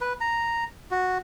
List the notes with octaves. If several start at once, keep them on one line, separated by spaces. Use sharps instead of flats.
B4
A#5
F#4